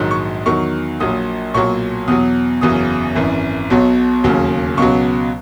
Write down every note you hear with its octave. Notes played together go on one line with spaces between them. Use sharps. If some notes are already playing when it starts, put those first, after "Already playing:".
Already playing: A#1 G#2 D#3 F#3
C#6
E2 D#3 F#3 C#6
A#1 A#2 F#3 D#6
B1 A#2 F#3 C#6
E2 B2 F#3 D#6
F#1 E2 C#3 F#3 D#6
G#1 F#2 E3
B1 B2 F#3
E1 D#2 C#3 F#3
C#2 B2 F#3 C#6